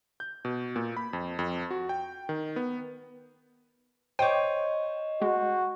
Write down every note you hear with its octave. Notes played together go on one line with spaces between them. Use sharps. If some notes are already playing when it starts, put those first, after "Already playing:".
G6
B2
A#2
B5
F2
F2
F#4
G5
D#3
B3
C5 C#5 D#5 G5 D6
G#3 F#4